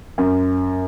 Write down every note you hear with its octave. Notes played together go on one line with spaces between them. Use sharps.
F#2